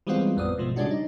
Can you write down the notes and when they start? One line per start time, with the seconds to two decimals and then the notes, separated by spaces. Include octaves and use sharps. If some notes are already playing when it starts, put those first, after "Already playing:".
0.07 E3 G3 G#3 B3 C4 F4
0.36 A1 F2 B3 D5 D#6
0.57 G#2 B2 F3 A3
0.76 C#3 G3 G#3 C#4 D4 F#4
0.91 D#4